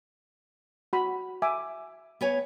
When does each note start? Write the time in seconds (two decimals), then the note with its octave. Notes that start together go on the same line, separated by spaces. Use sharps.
0.93 F#4 B5
1.42 E5 G#5 D6
2.21 B3 C#5 G#5